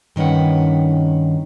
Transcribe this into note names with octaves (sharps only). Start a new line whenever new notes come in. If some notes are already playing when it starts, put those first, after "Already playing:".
G2 D#3 C#4 B4 F#5